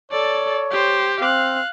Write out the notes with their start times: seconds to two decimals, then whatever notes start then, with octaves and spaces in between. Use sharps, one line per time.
0.12 A4 C#5 D5
0.71 G4 C5
1.21 C4 F5 F#6